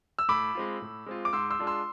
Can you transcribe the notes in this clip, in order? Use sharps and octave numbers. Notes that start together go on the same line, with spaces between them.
E6
A2 B5 D6
G#3 C4 F4
A2
G#3 C4 F4
D6
G#2 C6 E6
C6 E6
G#3 D4 F4
C6 E6